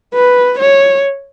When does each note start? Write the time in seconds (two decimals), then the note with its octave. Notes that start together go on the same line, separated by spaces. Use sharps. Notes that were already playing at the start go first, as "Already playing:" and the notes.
0.14 B4
0.59 C#5